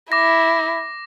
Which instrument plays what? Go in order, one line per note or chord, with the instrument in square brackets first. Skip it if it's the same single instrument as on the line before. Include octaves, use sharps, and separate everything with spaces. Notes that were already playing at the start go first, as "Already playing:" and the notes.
[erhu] E4 [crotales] D6 A#6